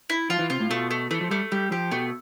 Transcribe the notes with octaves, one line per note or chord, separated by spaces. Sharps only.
E4
F3 F4
E3
C3 F4
A2
B2 A3
A3
E3 A3
F3
G3 A3
G3 G4
F3 G4
B2 A3